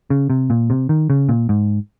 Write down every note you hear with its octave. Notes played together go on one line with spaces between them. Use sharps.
C#3
C3
A#2
C3
D#3
C#3
A#2
G#2